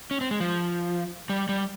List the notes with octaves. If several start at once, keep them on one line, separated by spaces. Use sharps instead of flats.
C#4
C4
G#3
F3
G3
G3